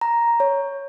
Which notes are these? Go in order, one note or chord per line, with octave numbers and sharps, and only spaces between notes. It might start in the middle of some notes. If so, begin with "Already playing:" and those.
A#5
C#5